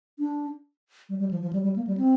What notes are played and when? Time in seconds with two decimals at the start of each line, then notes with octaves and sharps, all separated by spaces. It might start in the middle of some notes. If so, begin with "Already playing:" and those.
0.19 D4
1.09 G3
1.20 G3
1.31 F3
1.42 F3
1.53 G3
1.64 G3
1.76 A#3
1.87 G3
1.98 C4